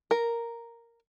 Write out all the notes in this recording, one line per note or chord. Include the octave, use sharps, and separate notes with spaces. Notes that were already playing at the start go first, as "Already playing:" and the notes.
A#4